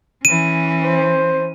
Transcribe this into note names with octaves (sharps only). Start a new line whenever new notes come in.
E3 C#4 D#7
C5